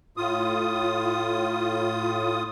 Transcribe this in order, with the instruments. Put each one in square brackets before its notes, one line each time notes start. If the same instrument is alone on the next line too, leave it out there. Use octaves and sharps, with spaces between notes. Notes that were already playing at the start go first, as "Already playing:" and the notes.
[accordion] A2 F4 D#6